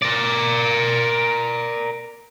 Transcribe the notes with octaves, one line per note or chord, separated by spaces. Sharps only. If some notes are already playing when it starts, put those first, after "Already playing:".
A#4 D5